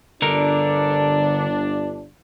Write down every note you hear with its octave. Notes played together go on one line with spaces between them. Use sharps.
G1 D3 D4 A#4